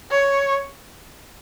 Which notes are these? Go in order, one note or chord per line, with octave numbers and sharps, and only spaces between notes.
C#5